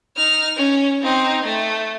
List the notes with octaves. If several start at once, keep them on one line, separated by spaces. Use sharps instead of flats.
D#4 F6
C#4
C4 D#4
A3